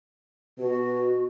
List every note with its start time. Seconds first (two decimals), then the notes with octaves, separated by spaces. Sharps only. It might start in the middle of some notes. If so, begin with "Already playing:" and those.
0.59 B2 F#4